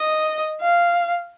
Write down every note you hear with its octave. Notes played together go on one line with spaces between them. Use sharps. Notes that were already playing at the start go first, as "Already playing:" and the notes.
Already playing: D#5
F5